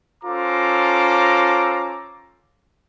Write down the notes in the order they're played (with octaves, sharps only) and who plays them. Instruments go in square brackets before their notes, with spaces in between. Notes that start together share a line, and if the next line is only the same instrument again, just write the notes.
[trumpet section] C#4 F4 A4 C5 A#5 D6